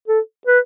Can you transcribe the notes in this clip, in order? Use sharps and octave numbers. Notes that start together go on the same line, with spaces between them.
A4
B4